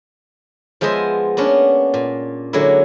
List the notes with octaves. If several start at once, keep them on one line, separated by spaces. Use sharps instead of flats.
F3 G#3 B3 C5 D#5 E5
A#3 B3 C#4 D4
A#2
D3 F#3 G#3 A#3 E4